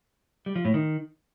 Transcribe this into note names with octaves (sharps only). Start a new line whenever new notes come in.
G3
F3
A2
D#3